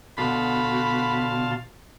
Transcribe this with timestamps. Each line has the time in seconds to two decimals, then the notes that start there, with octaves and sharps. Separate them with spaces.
0.18 B2 D3 F#4 F5 A5 B5 C6